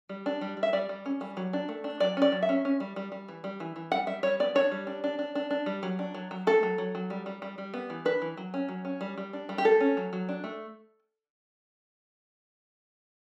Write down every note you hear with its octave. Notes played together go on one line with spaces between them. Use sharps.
G3
D4
G3
G3
E5
G3 D5
G3
C#4
G3
F#3
D4
A3
D4
F#3 D5
C#4 D5
F#3
E5
C#4
C#4
G3
G3
G3
E3
G3
E3
E3
G3 F#5
G3 E5
G3 C#5
B3 D5
D4 C#5
G3
D4
D4
D4
D4
D4
G3
F#3
D4
F#3
F#3
A3 A4
F#3
F#3
F#3
G3
G3
G3
G3
B3
E3
D4 B4
E3
F#3
C#4
F#3
C#4
G3
G3
D4
G3
G4
A3 A4
C#4
F#3
F#3
D4
A3